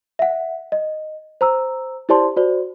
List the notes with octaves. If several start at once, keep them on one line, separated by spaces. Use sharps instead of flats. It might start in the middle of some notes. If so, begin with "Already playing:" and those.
E5 F#5
D#5
C5 A#5 E6
E4 G4 C5 D5 A5 C6
F#4 C5 D5